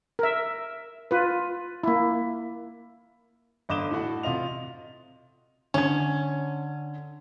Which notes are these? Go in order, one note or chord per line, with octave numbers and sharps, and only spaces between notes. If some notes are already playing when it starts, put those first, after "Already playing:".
A#4 E5
F4 B4
A#3 E4
G1 D#5 D6 D#6 E7 G7
A2 F#4
C3 F4 D#5 F7
D3 C#4 G#6